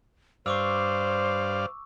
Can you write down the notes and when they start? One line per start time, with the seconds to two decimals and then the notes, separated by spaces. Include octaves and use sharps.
0.46 G2 C5 D5 F5 C#6 D6 E6